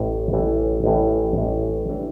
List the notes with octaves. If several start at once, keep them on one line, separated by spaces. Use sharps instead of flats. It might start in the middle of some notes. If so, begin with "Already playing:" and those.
Already playing: A1 A2 E3
A1 A2 E3
A1 A2 E3
A1 A2 E3
A2 E3 D4